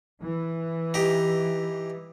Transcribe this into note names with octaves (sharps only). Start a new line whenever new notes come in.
E3
D#4 G4